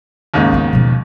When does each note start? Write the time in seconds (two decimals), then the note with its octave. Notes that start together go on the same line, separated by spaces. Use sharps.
0.34 D#2 G#2 C#3
0.53 B3 C#4
0.73 B2 F3